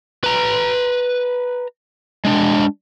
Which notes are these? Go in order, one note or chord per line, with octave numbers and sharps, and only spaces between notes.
B4 A#5
G#3 D4